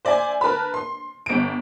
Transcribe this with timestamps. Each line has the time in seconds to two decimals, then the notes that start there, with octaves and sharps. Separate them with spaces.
0.05 C5 D5 E5 G#5
0.41 A#4 B4 A5 B5
0.74 C6
1.26 G1 D7